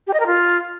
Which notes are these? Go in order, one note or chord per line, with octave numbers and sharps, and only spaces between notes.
G4
D#5
A#4
F4